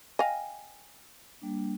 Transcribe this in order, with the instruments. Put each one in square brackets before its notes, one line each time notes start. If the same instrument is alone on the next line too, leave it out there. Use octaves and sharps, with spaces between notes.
[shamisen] D#5 F5 [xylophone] G5 G#5 A#6
[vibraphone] G3 A#3 D4